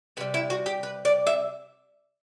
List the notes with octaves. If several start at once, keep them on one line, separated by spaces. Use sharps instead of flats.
C3 G3 B4
E4
F#4
G4
B4
D5
E5